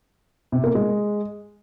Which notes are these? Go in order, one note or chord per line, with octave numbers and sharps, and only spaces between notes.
C3
A#3
G#3